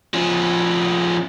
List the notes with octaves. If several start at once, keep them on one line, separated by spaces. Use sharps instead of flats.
F3 C#4